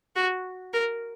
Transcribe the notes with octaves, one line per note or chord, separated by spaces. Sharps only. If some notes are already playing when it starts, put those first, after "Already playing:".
F#4
A#4